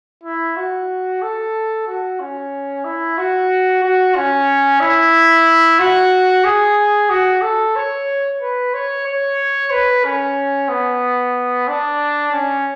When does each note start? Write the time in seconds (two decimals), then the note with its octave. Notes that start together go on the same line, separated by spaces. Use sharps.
0.23 E4
0.57 F#4
1.22 A4
1.87 F#4
2.20 C#4
2.84 E4
3.17 F#4
3.83 F#4
4.16 C#4
4.80 E4
5.79 F#4
6.44 G#4
7.09 F#4
7.42 A4
7.76 C#5
8.41 B4
8.74 C#5
9.06 C#5
9.71 B4
10.04 C#4
10.69 B3
11.68 D4
12.32 C#4